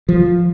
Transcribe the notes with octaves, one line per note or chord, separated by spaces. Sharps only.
F3